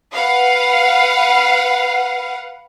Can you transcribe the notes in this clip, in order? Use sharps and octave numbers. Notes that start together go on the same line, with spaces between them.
B4 F5 F#5